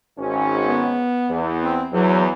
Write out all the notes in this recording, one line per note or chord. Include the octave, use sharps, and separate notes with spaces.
G#1 C#4
B3
E2
C4
E2 F#3